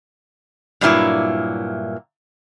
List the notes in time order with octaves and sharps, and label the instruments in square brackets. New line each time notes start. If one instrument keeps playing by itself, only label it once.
[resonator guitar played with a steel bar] G2 A#2 F#3 A#3 E4